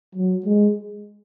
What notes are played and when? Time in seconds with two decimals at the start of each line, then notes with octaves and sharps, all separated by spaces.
0.15 F#3
0.45 G#3